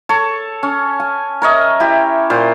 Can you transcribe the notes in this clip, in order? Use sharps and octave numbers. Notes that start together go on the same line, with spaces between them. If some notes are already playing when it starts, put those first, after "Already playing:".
A4 C#5
C#4
G#5
A#4 C#5 D#5 E5
E4 G4
A#2 C5